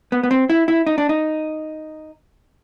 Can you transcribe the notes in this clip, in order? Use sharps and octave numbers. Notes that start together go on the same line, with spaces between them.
B3
B3
C4
E4
E4
D#4
D4
D#4